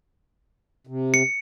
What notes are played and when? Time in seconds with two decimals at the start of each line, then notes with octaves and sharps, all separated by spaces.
0.87 C3
1.14 C#7